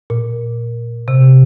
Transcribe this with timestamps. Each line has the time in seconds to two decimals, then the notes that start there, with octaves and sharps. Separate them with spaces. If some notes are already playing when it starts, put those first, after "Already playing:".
0.10 A#2
1.08 C3